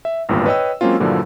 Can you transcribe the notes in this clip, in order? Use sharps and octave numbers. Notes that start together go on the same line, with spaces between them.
E5
G#1 E2 G2 A#2
B4 C#5 D#5 G5 E6
F#3 G#3 A#3 C4 C#4 F4
G2 A#2 D3 F3 F#3 E4